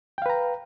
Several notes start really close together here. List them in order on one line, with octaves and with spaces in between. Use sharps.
G5 F5 B4 A#5